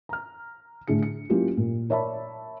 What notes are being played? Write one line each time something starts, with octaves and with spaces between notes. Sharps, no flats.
A#5 F6
A2 D3 G#4 C#7
C#7
F#3 A#3 C#4 E4 F4 G4
A#2
A#4 C#5 D5 E5 A5 B5